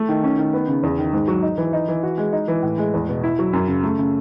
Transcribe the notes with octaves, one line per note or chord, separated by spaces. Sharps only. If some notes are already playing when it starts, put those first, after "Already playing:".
Already playing: A3
D#3
C#4
D#3
B3
C#3
E2
D#3
G#2
F#3
D#4
E3
D#4
E3
F#4
G#3
D#4
E3
A2
G#3
E2
B2
E4
F#3
F#2
C#3
A3
C#3